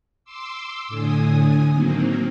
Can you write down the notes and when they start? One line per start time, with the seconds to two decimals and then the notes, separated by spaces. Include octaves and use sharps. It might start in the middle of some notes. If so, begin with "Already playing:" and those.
0.24 C6 D6 E6
0.88 A2 D3 G#5 D#6
1.72 D#3 F#3 A#3 C4